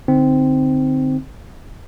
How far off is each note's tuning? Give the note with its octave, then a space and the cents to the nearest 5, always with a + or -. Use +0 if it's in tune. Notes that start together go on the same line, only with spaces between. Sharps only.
D3 +0 C4 -10 D#4 +0